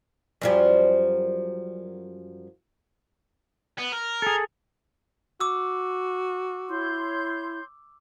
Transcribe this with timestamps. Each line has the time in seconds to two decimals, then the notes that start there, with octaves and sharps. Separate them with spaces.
0.42 F#2 F3 G3
3.78 B3
3.92 A#4
4.22 G#4 A4
5.40 F#4 D6 E6
6.69 E4 C#5 C6 G6